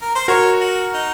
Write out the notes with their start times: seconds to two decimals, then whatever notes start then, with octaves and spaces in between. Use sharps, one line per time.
0.02 A#4
0.15 C5
0.28 F#4 A#4 C#5
0.61 F#4
0.94 D#4